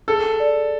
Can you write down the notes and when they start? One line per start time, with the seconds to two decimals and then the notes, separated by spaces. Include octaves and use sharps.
0.08 G#4 A4
0.40 D5